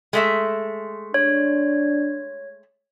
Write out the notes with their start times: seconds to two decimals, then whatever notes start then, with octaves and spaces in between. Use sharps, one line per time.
0.13 G#3 A3 E5
1.14 D4 C#5